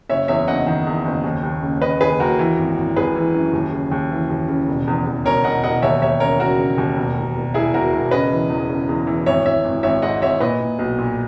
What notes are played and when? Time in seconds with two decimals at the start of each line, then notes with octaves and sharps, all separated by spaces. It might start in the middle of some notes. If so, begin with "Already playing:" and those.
0.09 F#1 C#5 E5
0.28 E2 C#5 E5
0.48 F#1 D#5 F#5
0.67 D#3
0.87 E2
1.05 F#1
1.24 D#2
1.43 D#2
1.63 C#3
1.82 C#3 B4 D#5
2.01 D#2 G#4 B4
2.20 D#2 F#4 A#4
2.39 E3
2.58 G#1
2.77 G#1
2.96 G#1 G#4 B4
3.16 E3
3.34 F#2
3.53 D#2
3.72 C#3
3.91 D#2
4.11 E3
4.30 D#2
4.48 C#3
4.68 E1
4.88 E2
5.07 E2
5.25 E1 A#4 C#5
5.44 E1 D#5 F#5
5.64 E1 D#5 F#5
5.82 D#2 C#5 E5
6.02 D#2 C#5 E5
6.20 C#3 A#4 C#5
6.40 C#3 F#4 A#4
6.59 C#3
6.78 D#2
6.97 E1
7.17 E1
7.36 E1
7.54 E1 E4 G#4
7.73 E1 F#4 A#4
7.93 E1
8.11 C#3 B4 D#5
8.31 E3
8.50 E2
8.70 C#3
8.89 E2
9.07 E3
9.26 G#1 C#5 E5
9.45 G#1 C#5 E5
9.64 G#1
9.83 G#1 C#5 E5
10.02 G#2 D#5 F#5
10.22 G#1 C#5 E5
10.40 A#2 B4 D#5
10.60 A#2
10.79 B1
10.98 A#2